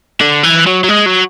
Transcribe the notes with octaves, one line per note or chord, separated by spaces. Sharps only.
D3
E3
F#3
F#3
G#3
F#3